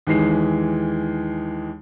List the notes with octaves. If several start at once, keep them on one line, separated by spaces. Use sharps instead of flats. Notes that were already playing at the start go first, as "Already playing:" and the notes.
D#2 E3 G#3 C7